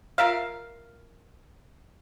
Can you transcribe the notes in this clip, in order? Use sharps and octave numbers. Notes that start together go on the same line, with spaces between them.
F4 A#4 E5 F5